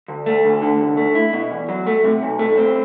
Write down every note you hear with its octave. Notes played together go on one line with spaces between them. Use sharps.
D2
A3
D2
D3
C2
A3
E4
B2
E2
F#3
A3
C3
B1
A3
C4